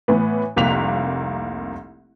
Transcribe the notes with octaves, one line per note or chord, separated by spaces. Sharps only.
A2 E3 B3
F1 C2 A#3 F#6 B6 F7